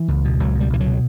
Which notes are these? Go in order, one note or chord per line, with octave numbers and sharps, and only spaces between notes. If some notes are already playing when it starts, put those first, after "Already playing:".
Already playing: E3
C#2
B2
C#2 F#3
B2
G3
C#2 E3
F#3
B2